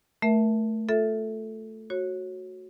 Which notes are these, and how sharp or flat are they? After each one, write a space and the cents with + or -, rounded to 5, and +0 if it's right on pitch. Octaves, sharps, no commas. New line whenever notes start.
A3 +0 A#4 +20 E5 +0
F4 +20 A4 +0 E5 +0
F#4 +0 C#5 -25